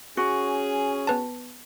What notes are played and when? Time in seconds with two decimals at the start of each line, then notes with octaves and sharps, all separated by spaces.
0.17 C#4 F#4 G#4
1.07 B3 B4 A5